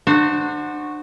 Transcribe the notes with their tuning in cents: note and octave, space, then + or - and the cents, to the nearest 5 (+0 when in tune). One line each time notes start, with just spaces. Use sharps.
D4 +35 F#4 -10 C5 +0